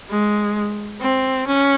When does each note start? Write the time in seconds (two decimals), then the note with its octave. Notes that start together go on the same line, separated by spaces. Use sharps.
0.10 G#3
1.00 C4
1.47 C#4